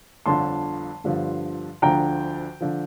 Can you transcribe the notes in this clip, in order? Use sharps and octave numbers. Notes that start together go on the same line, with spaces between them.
G1 F2 D3 F3 A5 C6
G1 G2 D3 F3
D2 D3 F3 G5 A#5
D3 F3